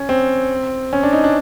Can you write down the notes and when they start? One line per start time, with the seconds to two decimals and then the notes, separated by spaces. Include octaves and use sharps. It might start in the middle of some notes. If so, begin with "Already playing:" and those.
Already playing: C#4
0.09 C4
0.93 C#4
1.03 D4
1.13 D#4
1.24 D4